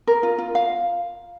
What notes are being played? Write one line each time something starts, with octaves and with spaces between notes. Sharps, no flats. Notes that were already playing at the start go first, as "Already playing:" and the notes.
A#4
F4
F4
F5